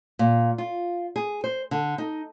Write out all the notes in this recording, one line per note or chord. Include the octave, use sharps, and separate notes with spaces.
A#2
F4
G#4
C5
D3
D#4